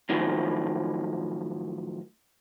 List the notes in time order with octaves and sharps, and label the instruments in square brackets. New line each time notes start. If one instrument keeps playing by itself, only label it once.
[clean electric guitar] A2 D#3 F3 F#3